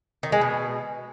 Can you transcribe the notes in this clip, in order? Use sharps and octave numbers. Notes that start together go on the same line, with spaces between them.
D#3
G#3
B2